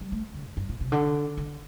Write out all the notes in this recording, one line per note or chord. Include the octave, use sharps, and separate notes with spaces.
G3
A3
D3
F2
G2
A#2
C3
D3
D3